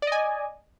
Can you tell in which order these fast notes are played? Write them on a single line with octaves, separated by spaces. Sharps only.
D5 D#5 G#5